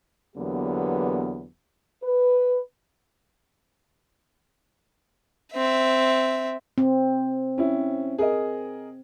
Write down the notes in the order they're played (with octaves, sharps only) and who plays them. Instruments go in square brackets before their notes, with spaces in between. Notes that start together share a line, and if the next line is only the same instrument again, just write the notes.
[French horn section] E2 D3 F#3 A#3 B3 G4
B4
[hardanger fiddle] C4 E5
[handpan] C4
[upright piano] C#4 E4
G#4 A#4 D#5